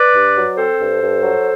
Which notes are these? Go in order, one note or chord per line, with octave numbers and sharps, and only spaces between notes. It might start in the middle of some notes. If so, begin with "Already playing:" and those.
Already playing: B4 D5
G2
F#3
C4 A4 C5
G2
G2
F#3